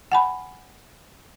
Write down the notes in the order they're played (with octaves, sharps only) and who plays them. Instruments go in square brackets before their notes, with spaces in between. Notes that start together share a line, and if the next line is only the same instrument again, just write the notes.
[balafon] F#5 G#5 B5